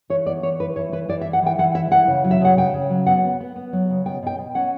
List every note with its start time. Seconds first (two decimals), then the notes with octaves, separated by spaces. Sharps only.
0.10 E3 C#5
0.26 B3 D5
0.43 E3 C#5
0.60 E4 B4
0.76 E3 C#5
0.92 E3 B4
1.09 E3 D5
1.21 E5
1.25 E4
1.33 F#5
1.43 E3 G5
1.58 E3 F#5
1.75 E4 E5
1.91 E3 F#5
2.08 C#3
2.24 F#3
2.31 E5
2.41 C#3 F#5
2.57 C#3 G5
2.74 C#3
2.90 F#3
3.07 B3 F#5
3.24 B3
3.41 B3
3.56 B3
3.73 F#3
3.89 C#3
4.06 B2 G5
4.23 B2 G5
4.38 B2
4.55 C#4 F#5